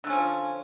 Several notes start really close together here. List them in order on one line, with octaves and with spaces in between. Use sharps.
D3 A3 C#4 F3